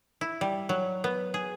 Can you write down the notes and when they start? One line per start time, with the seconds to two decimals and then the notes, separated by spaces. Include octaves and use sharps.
0.21 E4
0.41 G3
0.69 F#3
1.04 B3
1.34 G#4